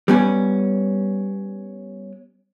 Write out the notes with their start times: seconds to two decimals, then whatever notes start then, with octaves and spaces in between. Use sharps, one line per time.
0.08 G3 B3 C#4